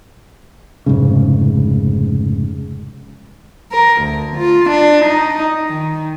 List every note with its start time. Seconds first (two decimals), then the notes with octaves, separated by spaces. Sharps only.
0.86 F1 G#2 C#3
3.72 A#4
4.02 D2
4.37 F4
4.70 D4
5.06 D#4
5.69 D#3